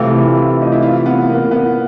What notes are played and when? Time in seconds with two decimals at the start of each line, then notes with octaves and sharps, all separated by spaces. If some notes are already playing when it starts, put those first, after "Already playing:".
Already playing: C3 E3 A3 F4
0.13 E4
0.35 F4
0.62 D#4
0.72 E4
0.82 F4
1.06 B3
1.29 A#3
1.51 B3